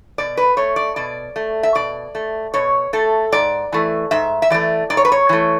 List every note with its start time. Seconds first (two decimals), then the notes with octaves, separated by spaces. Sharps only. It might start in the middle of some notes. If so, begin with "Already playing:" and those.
0.18 B2 D5
0.37 B4
0.57 A3 C#5
0.76 D5
0.96 B2 D5
1.36 A3
1.63 E5
1.75 B2 D5
2.15 A3
2.54 B2 C#5
2.93 A3 A4
3.32 G#2 D5
3.73 E3 A3
4.11 G#2 E5
4.42 E5
4.50 E3 A3 D5
4.90 G#2 D5
4.97 C#5
5.05 B4
5.12 C#5
5.29 E3 A3